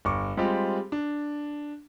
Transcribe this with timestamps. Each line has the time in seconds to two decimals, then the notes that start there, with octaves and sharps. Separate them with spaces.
0.05 G1 C#6 D6
0.37 G3 G#3 C4 F4 G4
0.92 D4